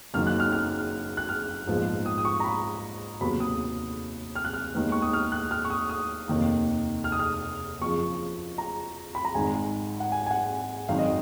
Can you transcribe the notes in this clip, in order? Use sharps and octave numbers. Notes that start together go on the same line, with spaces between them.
F#1 F#2 D#3 A#3 F6
F#6
F6
F6
F#6
F6
A#1 G#2 F3 B3
D#6
D#6
C#6
A#5
B5
F1 D#2 C#3 F#3 B3 B5
D#6
F6
F#6
F6
D#2 D#3 G#3 B3
C#6
D#6
F6
F#6
F6
C#6
D#6
D#6
F1 D#2 D#3 A#3
F6
D#6
F6
F#1 F2 C#3 F3 C#6
A#5
B5
A#5
G#1 G#2 D#3 G#5
F#5
G#5
G#5
F#5
G#1 F#2 D#3 F5
D#5